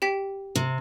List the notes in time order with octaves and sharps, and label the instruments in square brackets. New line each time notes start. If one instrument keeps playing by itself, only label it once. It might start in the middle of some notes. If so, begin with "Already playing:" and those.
[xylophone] G4 G5 B6
[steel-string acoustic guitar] C3